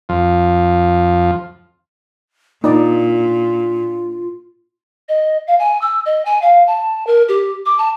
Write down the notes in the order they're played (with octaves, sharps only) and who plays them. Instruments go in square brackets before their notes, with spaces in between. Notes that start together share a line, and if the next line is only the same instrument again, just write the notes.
[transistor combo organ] F2 F3
[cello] A#2 [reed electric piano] A#3 D4 [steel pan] D#4 D5 [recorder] F4
[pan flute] D#5
F5
G#5
E6
D#5
G#5
F5
A5
A#4
G4
D6
A5